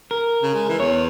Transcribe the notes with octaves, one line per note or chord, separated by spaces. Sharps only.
A#4
C#3
G#3
E3
E2 C#5